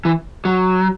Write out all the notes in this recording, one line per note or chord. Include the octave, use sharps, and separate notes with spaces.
E3
F#3